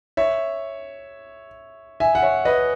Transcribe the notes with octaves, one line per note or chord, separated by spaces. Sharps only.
C#5 E5
E5 G#5
F#5
C#5 E5
B4 D#5